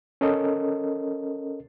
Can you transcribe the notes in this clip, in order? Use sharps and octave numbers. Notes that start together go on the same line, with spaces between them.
C#4 A4 A#4 D#5